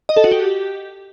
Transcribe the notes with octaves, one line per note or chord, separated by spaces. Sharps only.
D#5
A4
F#4
G4